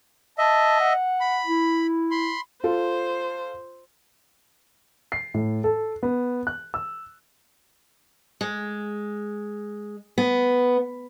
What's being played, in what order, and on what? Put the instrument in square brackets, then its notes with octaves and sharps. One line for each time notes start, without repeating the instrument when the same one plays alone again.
[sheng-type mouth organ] D#5 E5 [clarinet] A5
[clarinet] F#5
[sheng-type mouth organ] B5
[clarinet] E4
[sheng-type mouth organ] B5 C6
[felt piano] F4 A4 [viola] C5
[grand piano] C7
A2
A4
B3
F#6
E6
[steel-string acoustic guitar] G#3
B3